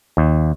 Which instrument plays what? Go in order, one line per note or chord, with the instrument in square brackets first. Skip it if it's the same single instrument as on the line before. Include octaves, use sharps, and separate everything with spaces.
[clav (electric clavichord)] D#2